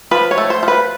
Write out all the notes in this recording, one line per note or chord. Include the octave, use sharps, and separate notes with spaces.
F3 B4
C#5
A3
C5
F3
B4